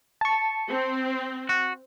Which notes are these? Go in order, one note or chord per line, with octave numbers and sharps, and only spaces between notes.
A5 C#6
C4
F#4